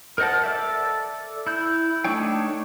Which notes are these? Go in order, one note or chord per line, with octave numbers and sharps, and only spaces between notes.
A#4 C5 D#5 F#5 A5
A4 D5 E5
E4 G6
A3 D4 D#4 C#5 G5